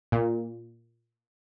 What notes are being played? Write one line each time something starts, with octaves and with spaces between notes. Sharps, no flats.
A#2